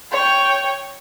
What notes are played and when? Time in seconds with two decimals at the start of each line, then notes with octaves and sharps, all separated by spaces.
0.12 C#5 G5